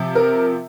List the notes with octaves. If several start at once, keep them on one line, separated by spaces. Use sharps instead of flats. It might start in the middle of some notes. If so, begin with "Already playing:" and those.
Already playing: C3 F3
A#4